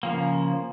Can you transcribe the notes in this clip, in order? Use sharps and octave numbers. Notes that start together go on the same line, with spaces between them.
C#3 F3 A#3